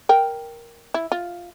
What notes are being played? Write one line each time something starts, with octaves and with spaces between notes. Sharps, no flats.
A#4 G5
E4
F4